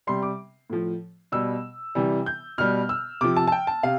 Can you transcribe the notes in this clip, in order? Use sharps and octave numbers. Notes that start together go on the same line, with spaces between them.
C3 G3 C6
D6
A2 F3
B2 G3 E6
C3 E3 G3
G6
B2 G3 F6
E6
C3 F3 D6
A5
A5
G5
A5
C3 F5